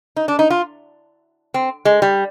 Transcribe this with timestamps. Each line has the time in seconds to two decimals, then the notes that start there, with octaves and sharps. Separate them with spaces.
0.16 D#4
0.28 D4
0.39 D#4
0.50 F4
1.54 C4
1.85 G#3
2.02 G3